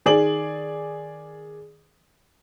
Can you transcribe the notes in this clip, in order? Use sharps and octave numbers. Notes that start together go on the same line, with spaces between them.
D#3 G#4 D5 F#7